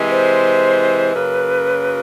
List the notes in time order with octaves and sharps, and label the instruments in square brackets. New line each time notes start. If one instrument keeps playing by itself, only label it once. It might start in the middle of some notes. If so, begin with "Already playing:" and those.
Already playing: [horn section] C3 E3 G#3
[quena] C5
[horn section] F#2 C#3 F#3 A#3 [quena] B4